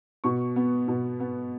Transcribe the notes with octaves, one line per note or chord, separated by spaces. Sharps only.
B2 C#6
B3
B2
B3